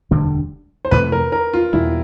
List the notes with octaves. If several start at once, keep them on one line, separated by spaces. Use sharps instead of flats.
E1 D2 D3 G3
C5
F2 C3 E3 A3 B4
A#4
A#4
F4
E2 B2 G3 E4